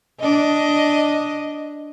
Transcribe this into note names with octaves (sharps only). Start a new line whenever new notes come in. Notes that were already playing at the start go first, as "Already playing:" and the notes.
D4 D#5